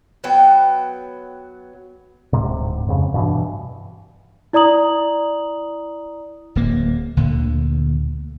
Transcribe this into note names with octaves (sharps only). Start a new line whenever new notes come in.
F#3 B3 G5
D1 G#2 C3
F2 C#3
G2 B2 E3
E4 D5 A#5 D#6 F#7
D1 A#3
D2 A#2 D3